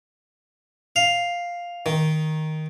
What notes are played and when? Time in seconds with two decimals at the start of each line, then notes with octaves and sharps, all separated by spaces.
0.96 F5
1.86 D#3